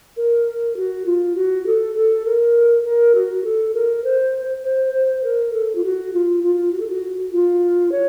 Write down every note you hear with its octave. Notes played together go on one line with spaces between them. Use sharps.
A#4
F#4
F4
F#4
A4
A4
A#4
A#4
F#4
A4
A#4
C5
C5
C5
A#4
A4
F4
F#4
F4
F4
F#4
A4
F#4
F4
C#5